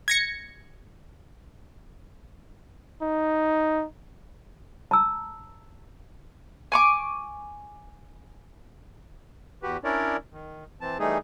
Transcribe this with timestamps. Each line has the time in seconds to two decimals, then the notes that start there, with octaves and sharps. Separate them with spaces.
0.08 G#6 A#6 C#7
3.02 D#4
4.91 A5 A#5 E6
6.72 G#5 C#6 D6
9.63 E2 F#4 G4 B4
9.84 C#4 D4 E4 A#4 C#5 D5
10.32 D#3
10.81 E3 C4 A5
10.99 E3 G3 A3 D#4 G#4